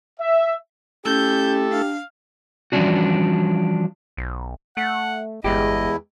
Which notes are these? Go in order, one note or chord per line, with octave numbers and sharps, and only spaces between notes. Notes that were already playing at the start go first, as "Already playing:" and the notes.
E5
A3 C#4 E4 G4 A4 G6
D4 F5
E3 F3 G3 C#4 D4 F#4
B1
A3 F#5
G1 E2 G#3 E4 G4 D#5